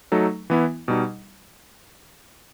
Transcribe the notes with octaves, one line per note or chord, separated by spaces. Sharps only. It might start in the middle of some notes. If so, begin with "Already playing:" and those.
F#3 A3 D#4 A4
E3 B3 E4
B2 G3 D#4